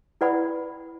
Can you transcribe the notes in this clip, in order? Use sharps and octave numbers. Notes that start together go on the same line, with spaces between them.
E4 B4 D5 F#5 B5